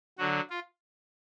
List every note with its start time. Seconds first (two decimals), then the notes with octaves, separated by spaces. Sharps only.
0.18 D3 F#3 F#4
0.50 F4